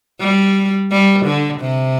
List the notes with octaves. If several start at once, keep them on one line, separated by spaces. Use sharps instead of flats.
G3
G3
D3
C3